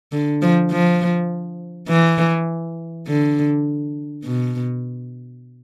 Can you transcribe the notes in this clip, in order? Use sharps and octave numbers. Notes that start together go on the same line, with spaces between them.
D3
F3
F3
E3
D3
B2